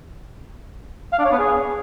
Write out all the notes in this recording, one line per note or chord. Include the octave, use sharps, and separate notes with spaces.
F5
D4
C#5
B3
G#4